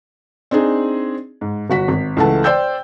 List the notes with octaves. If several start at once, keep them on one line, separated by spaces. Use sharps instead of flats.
C4 D4 D#4 G#4
G#2
G1 F#4 B6
G#1
C#2 E3 A3 F#5 A5
C5 D5 G5 E6 G6